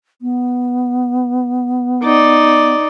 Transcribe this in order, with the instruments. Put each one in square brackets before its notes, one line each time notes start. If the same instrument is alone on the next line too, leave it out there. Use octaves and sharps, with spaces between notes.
[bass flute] B3
[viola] D#4 D5